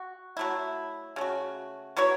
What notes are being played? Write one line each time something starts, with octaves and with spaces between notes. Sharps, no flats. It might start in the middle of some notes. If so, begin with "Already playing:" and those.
Already playing: F#4
F#3 A3 E4
C#3 A3 F#4
F#3 B3 E4 C#5